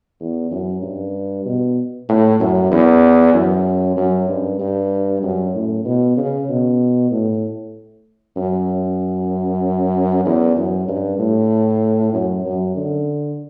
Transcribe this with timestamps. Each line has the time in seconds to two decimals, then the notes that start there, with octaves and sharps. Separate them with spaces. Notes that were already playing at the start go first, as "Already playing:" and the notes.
0.20 E2
0.51 F#2
0.83 G2
1.46 B2
2.09 A2
2.40 F#2
2.72 E2
3.34 F#2
3.97 F#2
4.29 G2
4.60 G2
5.23 F#2
5.54 A2
5.85 B2
6.17 C#3
6.49 B2
7.11 A2
8.37 F#2
10.26 E2
10.57 F#2
10.88 G2
11.19 A2
12.14 F#2
12.45 F#2
12.76 D3